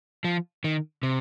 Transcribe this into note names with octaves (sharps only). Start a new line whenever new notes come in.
F3
D#3
C3